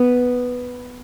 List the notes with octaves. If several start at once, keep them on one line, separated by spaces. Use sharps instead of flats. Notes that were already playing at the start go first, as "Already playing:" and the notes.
Already playing: B3